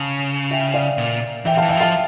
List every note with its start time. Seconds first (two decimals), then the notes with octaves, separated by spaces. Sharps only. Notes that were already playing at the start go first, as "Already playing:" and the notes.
Already playing: C#3 F5 A5
0.51 E5 G5
0.74 D5 F5
0.98 A#2
1.45 E3 E5 G5
1.57 E3 F5 A5
1.69 E5 G5
1.77 F3 F5 A5